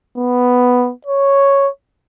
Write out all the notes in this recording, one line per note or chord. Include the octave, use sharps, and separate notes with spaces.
B3
C#5